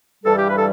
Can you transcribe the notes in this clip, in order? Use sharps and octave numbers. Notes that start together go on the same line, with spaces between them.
G2 E3 G3 A4
G4
B4
A4